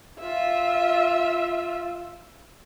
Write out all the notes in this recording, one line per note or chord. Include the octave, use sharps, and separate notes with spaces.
F4 E5